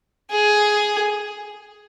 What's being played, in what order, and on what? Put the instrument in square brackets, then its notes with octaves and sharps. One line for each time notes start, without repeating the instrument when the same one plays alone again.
[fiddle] G#4